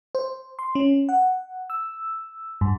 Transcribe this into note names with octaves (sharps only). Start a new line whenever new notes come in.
C5
C6
C#4
F#5
E6
G2